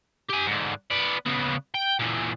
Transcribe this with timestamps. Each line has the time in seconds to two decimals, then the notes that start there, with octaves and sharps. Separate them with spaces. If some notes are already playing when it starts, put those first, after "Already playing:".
0.30 G4 G#5
0.47 G#2 D3
0.91 B3 D5
1.26 C#3 B3
1.75 G5
1.99 A#2 E3